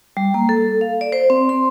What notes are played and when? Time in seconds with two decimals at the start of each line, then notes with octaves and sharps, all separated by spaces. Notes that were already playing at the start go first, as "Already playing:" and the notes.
0.17 G3
0.34 A#3
0.49 A4
0.81 F5
1.01 D5
1.12 C5
1.30 C4
1.49 C6